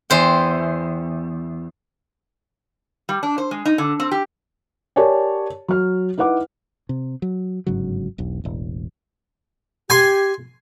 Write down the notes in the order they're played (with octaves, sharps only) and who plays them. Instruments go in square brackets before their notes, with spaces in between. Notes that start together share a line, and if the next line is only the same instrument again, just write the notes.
[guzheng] E2 C5 G5
[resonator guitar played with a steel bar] G3
D4
C5
G#3
D#4
D3
C4
G4
[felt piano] G4 A#4 C#5 D5 G#5 A5
F#3 F6
D#4 E4 B4 F#5 D6
[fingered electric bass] C3
F#3
G1 G#2 C#3 F#3
E1 B1
E1 A1
[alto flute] G4 [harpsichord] G#5 C6